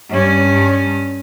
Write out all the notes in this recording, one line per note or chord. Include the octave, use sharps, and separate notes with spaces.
G2 C#4